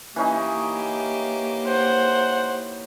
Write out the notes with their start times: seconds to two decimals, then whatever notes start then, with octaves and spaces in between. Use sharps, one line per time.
0.16 E3 A#3 C#4 D#4 G4
1.67 C5 F#5